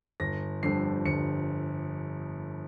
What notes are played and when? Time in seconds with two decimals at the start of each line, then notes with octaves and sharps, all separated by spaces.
0.20 G1 A#6
0.63 F2 D3 G3 C7
1.05 G1 C#7